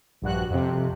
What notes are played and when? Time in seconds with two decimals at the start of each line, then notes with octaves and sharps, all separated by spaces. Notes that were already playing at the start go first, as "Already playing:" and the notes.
0.22 A#1 G2 F#4 F#6
0.50 F2 C3